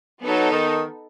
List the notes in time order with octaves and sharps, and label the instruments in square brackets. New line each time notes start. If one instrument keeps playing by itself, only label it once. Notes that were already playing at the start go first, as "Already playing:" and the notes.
[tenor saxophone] F#3 [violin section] B3 D#4 A4
[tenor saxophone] D#3